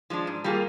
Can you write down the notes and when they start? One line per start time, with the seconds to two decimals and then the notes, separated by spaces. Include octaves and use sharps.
0.10 F3 G#3 D4
0.27 G#2
0.44 G3 A#3 F4 G#4